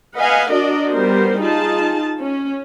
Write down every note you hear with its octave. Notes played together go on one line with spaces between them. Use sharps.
B4 D#5 F5 F#5 G#5
D4 F#4 A#4 D5 D#5
G3 B3 A#4 C5
D#4 F4 G#4 A5
C#4